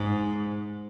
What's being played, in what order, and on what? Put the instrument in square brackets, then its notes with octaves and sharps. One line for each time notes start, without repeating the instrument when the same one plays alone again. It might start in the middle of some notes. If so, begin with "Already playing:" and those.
Already playing: [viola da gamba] G#2